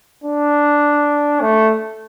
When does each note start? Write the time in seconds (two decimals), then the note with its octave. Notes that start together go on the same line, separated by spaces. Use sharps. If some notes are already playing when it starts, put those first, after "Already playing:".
0.24 D4
1.41 A3